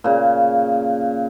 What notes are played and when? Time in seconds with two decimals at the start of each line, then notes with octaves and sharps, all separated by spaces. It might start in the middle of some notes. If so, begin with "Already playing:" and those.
0.04 A#2 C#3